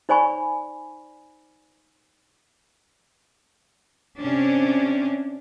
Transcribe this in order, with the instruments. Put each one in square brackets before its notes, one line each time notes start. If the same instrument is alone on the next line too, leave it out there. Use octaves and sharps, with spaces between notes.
[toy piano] D#4 C5 D5 G#5 B5 C#6
[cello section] C3 C#4 D4